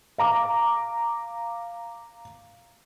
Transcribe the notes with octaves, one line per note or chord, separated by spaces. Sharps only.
F5 A#5 D6